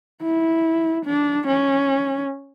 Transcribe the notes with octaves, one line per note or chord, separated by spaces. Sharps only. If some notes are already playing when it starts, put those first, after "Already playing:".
E4
D4
C#4